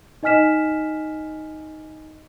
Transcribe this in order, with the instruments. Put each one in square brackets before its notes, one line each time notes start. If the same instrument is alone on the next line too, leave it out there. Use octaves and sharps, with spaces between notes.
[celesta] D#4 D#5 G#5 F6 B6 E7